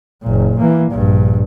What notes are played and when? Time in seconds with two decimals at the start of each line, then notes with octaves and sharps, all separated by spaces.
0.23 F#1 A#2
0.59 E3 A#3
0.91 A#1 G2